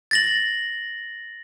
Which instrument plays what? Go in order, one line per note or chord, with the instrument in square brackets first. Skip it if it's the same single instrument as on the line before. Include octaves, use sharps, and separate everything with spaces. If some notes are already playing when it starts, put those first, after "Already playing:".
[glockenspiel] A6 A#6 F#7